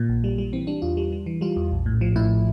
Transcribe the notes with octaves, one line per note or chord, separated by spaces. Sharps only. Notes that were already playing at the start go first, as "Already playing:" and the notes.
Already playing: A#2
A#1
G3
G3
E3 C4
G3 D4
E2 F4
G3
G3
E3
G3 F4
E2
A#1
A2
F3
A2 E4